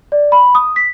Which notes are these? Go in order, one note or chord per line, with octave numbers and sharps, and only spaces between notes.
D5
B5
D#6
B6